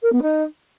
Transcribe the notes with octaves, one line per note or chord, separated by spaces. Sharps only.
A#4
B3
D#4